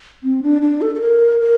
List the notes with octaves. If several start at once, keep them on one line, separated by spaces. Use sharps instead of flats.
C4
D4
D4
A4
A4
A#4
A#4